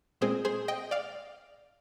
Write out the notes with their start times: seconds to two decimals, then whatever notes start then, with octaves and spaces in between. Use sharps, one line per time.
0.21 A#2 G#3 C4 G#4 C5
0.45 G#4 C5
0.68 D#5 G5
0.91 D5 F5